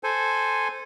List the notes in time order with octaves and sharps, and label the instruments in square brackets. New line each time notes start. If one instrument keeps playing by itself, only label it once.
[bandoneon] A4 C5 G#5